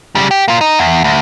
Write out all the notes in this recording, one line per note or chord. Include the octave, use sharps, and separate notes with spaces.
C#3 G3
G4
A#3 F4
D#4
E2
D2